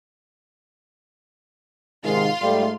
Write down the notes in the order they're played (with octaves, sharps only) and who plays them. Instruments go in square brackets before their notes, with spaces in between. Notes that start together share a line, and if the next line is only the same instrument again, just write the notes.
[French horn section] G#2 C3 D#3 [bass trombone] G#3 [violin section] F4 F5 C6
[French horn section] G#2 A3 [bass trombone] G3